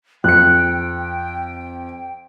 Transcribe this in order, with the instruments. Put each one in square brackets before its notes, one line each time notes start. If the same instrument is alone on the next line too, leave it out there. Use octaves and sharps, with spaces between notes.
[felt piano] F2 [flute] G5 [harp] F#6 C#7